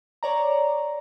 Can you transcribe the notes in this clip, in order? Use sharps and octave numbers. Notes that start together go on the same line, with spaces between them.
C#5 D5 A#5